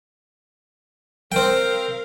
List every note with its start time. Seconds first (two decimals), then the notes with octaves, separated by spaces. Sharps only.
1.32 C4 A#4 F5 G5